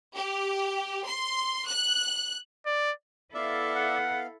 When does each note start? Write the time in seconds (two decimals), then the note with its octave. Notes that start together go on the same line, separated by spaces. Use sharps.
0.15 G4
1.05 C6
1.67 F#6
2.66 D5
3.34 B3 E4 A4 D5 E5 F5
3.76 F#5